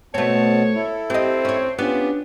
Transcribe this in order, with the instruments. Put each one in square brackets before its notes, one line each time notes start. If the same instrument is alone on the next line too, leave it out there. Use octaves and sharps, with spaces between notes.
[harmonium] B2 B3 A5 [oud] A3 C4 [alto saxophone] C#5
[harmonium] E4 A4
[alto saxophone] C4 [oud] G4 D#5
[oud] C#4 C#5
[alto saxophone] B3 [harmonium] C#4 F4 G4 [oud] D4